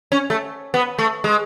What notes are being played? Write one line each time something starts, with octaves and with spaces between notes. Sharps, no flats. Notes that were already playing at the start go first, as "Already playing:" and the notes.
C#4
A3
B3
A3
G#3